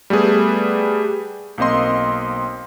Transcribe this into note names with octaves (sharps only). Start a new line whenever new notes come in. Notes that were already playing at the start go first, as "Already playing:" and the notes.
G3 A3 B3 G#4 B4
B1 A#3 C4 D#5 C6